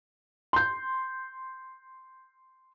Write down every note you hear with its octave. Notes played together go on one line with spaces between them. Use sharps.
C6 G6